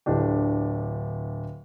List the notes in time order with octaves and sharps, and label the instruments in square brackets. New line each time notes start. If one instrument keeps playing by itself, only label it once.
[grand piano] D1 D3 D4 G4